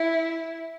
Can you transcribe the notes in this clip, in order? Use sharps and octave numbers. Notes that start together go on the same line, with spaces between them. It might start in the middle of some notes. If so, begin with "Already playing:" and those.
Already playing: E4